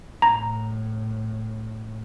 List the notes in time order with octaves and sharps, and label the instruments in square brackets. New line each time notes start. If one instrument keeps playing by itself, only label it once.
[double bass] A2 [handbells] A#5